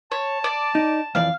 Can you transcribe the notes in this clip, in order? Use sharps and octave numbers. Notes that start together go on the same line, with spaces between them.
C#5 A5
D5
D#4
F2 E3 D5 F5